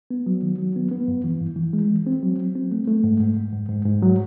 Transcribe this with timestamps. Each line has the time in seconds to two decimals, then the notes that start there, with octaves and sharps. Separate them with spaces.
0.11 B3
0.26 F#3
0.42 D#3
0.58 F#3
0.76 B3
0.91 B3
1.08 G2
1.24 E3
1.41 G2
1.56 E3
1.73 G#3
1.90 E3
2.07 C4
2.23 F#3
2.39 F#3
2.56 C4
2.72 A3
2.87 A3
3.04 G#2
3.20 G#2
3.37 G#2
3.52 G#2
3.69 G#2
3.85 G#2
4.03 F#3